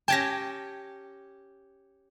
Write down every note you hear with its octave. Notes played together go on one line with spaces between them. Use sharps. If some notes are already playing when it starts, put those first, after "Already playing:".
C#4 G4 G5 A5 G#6 A#6